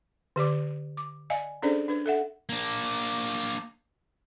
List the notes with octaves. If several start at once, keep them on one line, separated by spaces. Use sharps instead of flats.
D3 G4 D5 D6
D6
D5 D#5 F5 G#5
C#4 D4 G#4 A4 C5 D5
D4 B4
A4 E5 F#5
A#3 D4